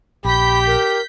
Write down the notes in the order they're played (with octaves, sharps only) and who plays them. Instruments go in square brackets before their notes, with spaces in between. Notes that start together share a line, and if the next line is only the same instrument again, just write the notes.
[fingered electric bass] A#1 [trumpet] G4 [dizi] B5 [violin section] G6 B6
[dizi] A#4